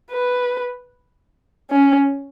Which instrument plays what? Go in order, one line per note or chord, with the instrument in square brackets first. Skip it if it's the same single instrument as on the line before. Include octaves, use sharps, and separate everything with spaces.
[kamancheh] B4
C#4